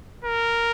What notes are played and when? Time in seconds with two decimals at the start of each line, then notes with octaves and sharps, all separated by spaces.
0.24 A#4